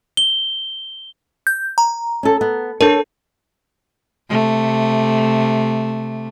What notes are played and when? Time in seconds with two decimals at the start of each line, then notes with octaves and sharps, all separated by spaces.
0.17 G7
1.47 G6
1.78 A#5
2.23 C#4 A4
2.41 B3
2.81 D4 A4 A#4 C#5
4.29 C3 A3